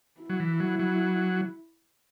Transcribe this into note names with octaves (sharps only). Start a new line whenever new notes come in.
E4
F#3
E3
F#3
F#3